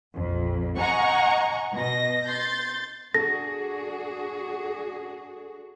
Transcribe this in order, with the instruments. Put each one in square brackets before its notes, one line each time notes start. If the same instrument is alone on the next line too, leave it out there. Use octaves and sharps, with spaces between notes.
[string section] A#1 F2
D#5 F#5 G#5 A#5 C#6
B2 D#5 A#6
C6 G6 A6
[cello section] D4 F#4 G#4 [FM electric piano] A4 [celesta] A#6